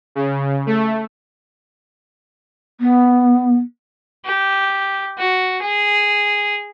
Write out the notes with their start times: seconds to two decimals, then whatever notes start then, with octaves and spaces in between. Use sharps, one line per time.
0.15 C#3
0.66 A3
2.80 B3
4.25 G4
5.18 F#4
5.62 G#4